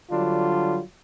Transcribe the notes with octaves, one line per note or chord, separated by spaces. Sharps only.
D3 F#3 G3 D4 F4